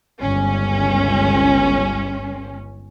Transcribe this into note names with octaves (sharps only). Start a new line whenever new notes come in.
G1 C#2 C#4